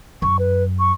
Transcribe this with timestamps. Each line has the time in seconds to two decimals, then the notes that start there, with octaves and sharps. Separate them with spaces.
0.22 F#2 C#6
0.39 B4
0.79 C#6